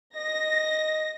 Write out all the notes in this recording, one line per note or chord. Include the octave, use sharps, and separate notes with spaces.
D#5 A#6